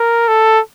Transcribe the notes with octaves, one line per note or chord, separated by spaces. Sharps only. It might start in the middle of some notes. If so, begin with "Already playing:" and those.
Already playing: A#4
A4